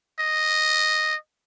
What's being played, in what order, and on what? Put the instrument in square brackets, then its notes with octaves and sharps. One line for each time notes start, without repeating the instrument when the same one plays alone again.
[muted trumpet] D#5